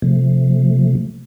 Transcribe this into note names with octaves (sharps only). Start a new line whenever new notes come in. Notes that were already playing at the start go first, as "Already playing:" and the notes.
C3 F3 A3